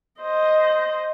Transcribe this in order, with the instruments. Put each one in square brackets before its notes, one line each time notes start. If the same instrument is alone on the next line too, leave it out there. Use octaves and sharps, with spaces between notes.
[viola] C5 D#5